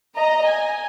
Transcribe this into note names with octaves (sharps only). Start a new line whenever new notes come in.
D#5 A#5
G#5